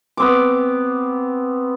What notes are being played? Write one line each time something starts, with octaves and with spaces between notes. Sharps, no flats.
B3 C4 D6